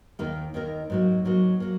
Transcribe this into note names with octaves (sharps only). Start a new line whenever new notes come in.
D#2 D#3 A#3 D#4 A#4
D#2 D#3 A#3 D#4 A#4
G#2 F#3 A#3
G#2 F#3 A#3
F#3 A#3